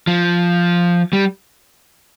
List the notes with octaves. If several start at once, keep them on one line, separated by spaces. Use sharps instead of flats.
F3
G3